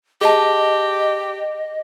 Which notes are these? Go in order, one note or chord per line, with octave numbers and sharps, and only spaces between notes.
G4 G#4 D#5 A5